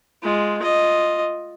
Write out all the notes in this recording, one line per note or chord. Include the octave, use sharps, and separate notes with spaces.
G#3 F4
F4 D#5